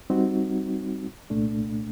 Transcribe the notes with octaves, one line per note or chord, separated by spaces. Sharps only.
G3 C4 D#4 F#4
C2 A#2 A3 D4